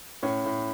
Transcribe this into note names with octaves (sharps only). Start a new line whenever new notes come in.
A2 C#4
A2